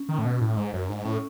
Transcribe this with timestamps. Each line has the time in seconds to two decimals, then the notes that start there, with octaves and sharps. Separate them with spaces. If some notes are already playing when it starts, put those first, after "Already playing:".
Already playing: C#4
0.09 D#3
0.19 A2
0.25 B2
0.41 A2
0.57 G#2
0.74 F#2
0.89 G#2
1.05 A2 C#4